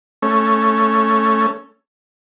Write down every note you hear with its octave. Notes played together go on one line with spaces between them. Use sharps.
A3 C#4